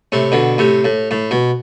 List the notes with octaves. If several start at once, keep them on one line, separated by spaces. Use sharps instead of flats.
A2 C3
B2 D3
A2 C3
A2
A2
B2